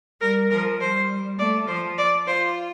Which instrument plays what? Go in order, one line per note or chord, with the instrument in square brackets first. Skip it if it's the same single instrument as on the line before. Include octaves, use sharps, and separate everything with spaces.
[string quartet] G3 [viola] A#4
[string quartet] F3 [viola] A#4
[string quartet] G3 [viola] C5
[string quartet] A3 [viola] D5
[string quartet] F3 [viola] C5
[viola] D5
[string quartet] F4 [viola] C5